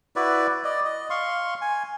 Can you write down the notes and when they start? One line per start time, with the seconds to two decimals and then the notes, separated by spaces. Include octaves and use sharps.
0.16 E4 F#4 B4 D5
0.64 D5 D#5
0.85 D#5
1.10 F5 C6 C#6
1.61 G#5